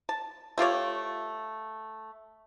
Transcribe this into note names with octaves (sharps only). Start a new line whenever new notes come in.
A5
A3 F4 G4 C#5